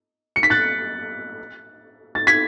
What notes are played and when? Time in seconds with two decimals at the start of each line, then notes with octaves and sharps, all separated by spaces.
0.36 C#7
0.43 B6
0.50 F#6 A6
2.15 A6
2.27 G#6 B6